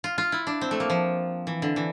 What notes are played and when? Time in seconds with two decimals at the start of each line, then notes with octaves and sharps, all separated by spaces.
0.04 F4
0.18 F4
0.32 E4
0.47 D4
0.61 C4
0.71 A3
0.80 A#3
0.90 F3
1.47 E3
1.62 D3
1.76 E3